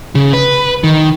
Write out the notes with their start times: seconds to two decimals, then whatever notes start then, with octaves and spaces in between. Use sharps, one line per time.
0.15 C#3
0.33 B4
0.84 D#3